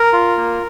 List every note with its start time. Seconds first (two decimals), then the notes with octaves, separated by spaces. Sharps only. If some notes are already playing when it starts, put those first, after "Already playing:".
Already playing: A#4
0.13 F4
0.37 A#3